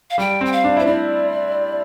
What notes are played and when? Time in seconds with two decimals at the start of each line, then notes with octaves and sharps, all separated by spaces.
0.10 F5
0.18 G3 G5
0.41 C4 G5
0.52 F5
0.64 D4
0.77 E4 C5
0.86 D4 D5